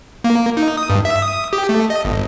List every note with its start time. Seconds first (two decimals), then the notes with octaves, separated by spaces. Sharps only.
0.24 A#3
0.57 D#4
0.77 D#6
0.90 G2
1.05 E5
1.22 D#6
1.53 G4
1.69 A3
1.90 D#5
2.05 G1